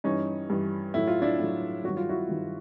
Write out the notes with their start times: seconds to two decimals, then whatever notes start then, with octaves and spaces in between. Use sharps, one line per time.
0.04 G2 E3 C#4 D#4
0.50 G2 E3
0.94 A2 F#3 E4
1.07 F4
1.22 D4 E4
1.39 A2 F#3
1.84 G2 D#3 F#3 F#4
1.97 F4
2.09 E4 F#4
2.29 G2 D#3 F#3